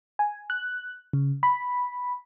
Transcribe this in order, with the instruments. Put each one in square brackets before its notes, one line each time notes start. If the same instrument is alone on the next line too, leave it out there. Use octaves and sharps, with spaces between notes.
[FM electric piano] G#5
F#6
C#3
B5